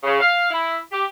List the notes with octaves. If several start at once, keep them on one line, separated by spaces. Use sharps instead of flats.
C#3
F5
E4
G4